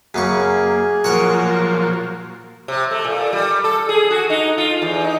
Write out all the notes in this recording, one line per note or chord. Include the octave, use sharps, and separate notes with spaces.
F#2 C#3 A#3 G#4 C#6
A#2 F3 F#3 A#4 C#5 F#5 C#6
C3
A3
A#2
G3
A4
G#4
F#4
D#4
F4
E2
D#4